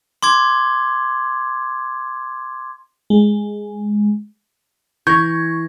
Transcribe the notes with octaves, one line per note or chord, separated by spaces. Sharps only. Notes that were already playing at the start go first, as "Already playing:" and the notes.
C6 D6 G#6
G#3
E3 C#6 G6 G#6 A#6